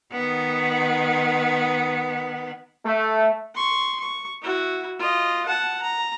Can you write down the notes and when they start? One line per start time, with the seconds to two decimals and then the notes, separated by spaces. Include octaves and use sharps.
0.12 D#3 B3
2.85 A3
3.54 C6 C#6
4.00 C#6
4.42 E4 F#4
4.99 F4 D#5
5.46 F#5 A5
5.82 A#5